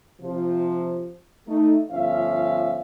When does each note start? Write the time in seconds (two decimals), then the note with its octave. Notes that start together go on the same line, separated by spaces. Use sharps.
0.21 C3 F3
1.48 A3 D#4
1.91 G1 F3 C#4 E5 F5